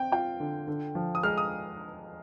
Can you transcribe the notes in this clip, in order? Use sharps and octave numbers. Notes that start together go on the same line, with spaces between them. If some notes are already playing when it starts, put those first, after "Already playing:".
Already playing: C4 G5
F4 G5
D3
D3
F3
D#6
G#3 F6
D#6